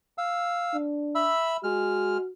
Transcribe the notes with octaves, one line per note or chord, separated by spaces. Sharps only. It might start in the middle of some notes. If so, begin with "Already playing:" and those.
F5 E6
D4
E5 B5 E6
G#3 F#4 F6